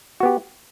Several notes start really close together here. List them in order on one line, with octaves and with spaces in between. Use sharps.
F#4 B3 G4